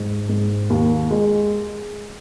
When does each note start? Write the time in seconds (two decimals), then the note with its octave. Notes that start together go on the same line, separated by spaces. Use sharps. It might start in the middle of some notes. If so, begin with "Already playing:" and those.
Already playing: G#2
0.29 G#2
0.70 D#2
1.11 G#3